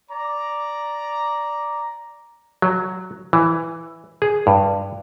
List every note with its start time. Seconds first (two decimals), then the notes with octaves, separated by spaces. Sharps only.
0.11 D5 A#5
2.62 F#3
3.33 E3
4.22 G#4
4.47 G2